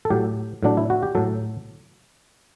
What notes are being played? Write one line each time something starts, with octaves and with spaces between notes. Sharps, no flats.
A4
A2 F#3 G4
A2 F#3 D4
E4
F#4
G4
A2 F#3 A4